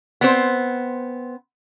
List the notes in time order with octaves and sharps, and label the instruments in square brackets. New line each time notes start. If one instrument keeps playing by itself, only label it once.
[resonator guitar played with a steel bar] B3 C4 C5